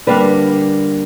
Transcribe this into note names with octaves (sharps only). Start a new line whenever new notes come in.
D3 G3 A#3 D4 B4